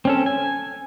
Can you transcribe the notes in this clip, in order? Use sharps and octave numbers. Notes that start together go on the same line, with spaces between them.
C4 C#4 A4
G#5